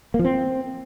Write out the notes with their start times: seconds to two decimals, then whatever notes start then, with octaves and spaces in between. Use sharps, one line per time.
0.14 A#3
0.19 F3
0.25 C4